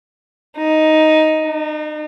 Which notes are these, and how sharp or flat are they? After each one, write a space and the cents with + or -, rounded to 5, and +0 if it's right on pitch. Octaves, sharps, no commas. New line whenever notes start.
D#4 +5
D#4 -35